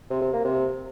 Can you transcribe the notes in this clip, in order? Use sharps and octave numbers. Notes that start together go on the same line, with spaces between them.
C3
C3
A#3
C3